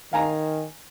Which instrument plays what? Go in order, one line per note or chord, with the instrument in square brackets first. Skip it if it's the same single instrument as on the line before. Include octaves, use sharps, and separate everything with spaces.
[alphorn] D#3 [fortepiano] F5 G#5 A#5